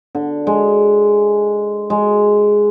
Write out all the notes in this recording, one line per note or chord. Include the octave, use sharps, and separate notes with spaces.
D3
G#3
G#3